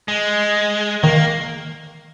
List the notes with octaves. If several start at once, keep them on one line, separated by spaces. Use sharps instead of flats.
G#3
D#3 A#3